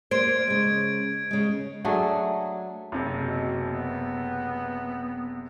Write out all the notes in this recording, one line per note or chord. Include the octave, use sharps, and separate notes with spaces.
A#3 C5 D5 G#6 D7
C#3 G#3
C#3 G#3
F#3 A3 D4 G#4
F#1 C3
B2
B3